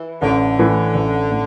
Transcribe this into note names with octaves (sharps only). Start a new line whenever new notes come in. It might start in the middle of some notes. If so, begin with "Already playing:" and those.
Already playing: E3
A1 D3
A2 E3
A1
A2